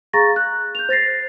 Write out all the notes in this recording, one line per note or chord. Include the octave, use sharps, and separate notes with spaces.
G#4 F5 A#5 C#6 A6 A#6
F#6
G6 F7
C5 A6 A#6 C7